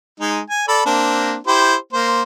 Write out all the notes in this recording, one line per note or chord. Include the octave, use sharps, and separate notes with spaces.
G#3 D#4
G#5
A4 D5 B5
A#3 C4 D4
E4 G4 C5
A#3 C5